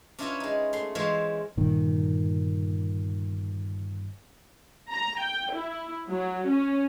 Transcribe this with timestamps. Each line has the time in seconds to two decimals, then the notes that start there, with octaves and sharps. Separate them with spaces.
0.19 C#4 D4 E4 F4 B4 C#5
0.40 G#3 D#4
0.73 A3 C6
0.95 E3 G#3 F4 C5 C#5 E5
1.57 G1 A#2 D#3
4.90 A#5
5.21 G5
5.52 E4
6.10 F#3
6.49 C#4